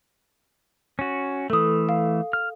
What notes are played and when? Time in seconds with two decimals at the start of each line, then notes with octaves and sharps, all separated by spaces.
0.99 C#4 F#4
1.50 E3 A3 A4 D#6
1.89 F5
2.33 F6